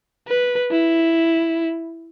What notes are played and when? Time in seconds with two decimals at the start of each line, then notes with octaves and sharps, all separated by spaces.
0.28 B4
0.71 E4